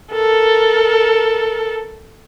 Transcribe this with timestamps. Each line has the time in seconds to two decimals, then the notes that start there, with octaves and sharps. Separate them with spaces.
0.12 A4 A#4